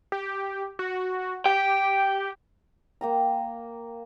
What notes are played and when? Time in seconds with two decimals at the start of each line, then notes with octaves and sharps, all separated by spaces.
0.12 G4
0.79 F#4
1.46 G4 G5
3.01 A#3 G5 A#5